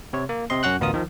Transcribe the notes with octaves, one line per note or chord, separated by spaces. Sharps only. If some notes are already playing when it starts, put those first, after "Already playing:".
C3 C#5
A#3
C3 C4 D#5 C6
F#2 C#4 F#4 F#5 F#6
A1 D2 B3 F4 A#4 D#6
D#3 F3